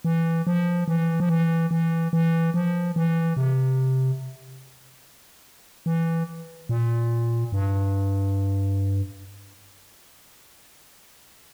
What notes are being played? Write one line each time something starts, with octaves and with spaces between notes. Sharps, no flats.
E3
F3
E3
F3
E3
E3
E3
F3
E3
C3
E3
A#2
G2